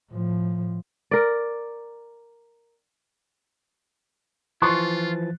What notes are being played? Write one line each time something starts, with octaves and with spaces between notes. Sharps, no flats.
A2 F3
A#4 D5
E3 F3 F4 C6 C#6 F#6 A6